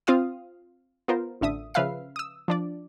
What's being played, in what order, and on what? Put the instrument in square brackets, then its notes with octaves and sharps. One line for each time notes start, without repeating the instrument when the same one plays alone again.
[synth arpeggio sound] C4 F4 F5 D#6
B3 F4 A#4 C5
A1 D3 E5 D#6
C#3 F3 B4 E5 F5 C7
D#6 E6
F3 D4 D5